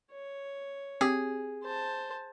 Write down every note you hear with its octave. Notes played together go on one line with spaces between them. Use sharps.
C#5
C4 G4 G#4
C5 A5